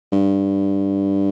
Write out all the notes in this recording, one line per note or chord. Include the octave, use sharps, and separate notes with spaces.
G2